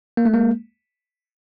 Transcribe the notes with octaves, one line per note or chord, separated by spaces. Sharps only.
A#3
A3
G#3 A#3